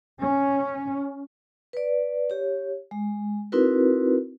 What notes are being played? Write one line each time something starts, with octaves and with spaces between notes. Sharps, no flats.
C#4
B4 D5
G4 C#5
G#3
C4 D#4 E4 F#4 A#4 B4